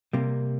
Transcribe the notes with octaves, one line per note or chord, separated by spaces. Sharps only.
C3 G3 A#3